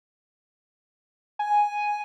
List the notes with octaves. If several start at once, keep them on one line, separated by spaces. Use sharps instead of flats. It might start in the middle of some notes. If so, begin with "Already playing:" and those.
G#5